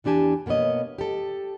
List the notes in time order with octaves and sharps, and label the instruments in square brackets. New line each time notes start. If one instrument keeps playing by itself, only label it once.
[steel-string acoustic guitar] E2 E3 D4 G4 G#5 A5
B2 A#3 B3 C#5 D#5
G4 A4